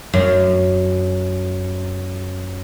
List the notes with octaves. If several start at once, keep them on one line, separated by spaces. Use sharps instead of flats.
F#2